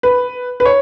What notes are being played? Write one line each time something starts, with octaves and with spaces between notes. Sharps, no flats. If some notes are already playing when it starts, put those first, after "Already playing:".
B4
B4
C#5